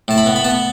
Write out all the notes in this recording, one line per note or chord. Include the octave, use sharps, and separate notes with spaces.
A2 A5
B5
B3
B5
B3 A5